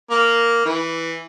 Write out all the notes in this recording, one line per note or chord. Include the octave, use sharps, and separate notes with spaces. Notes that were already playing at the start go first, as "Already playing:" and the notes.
A#3
E3